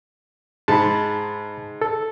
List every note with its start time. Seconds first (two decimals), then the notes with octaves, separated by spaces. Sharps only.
0.68 G#2 A5 B5
1.82 A4